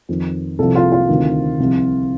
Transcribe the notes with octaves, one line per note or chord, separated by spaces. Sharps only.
F2 D#3
C2 C3 F3 A4
F4
F4
D2 C3 D#3
C2 C3 F3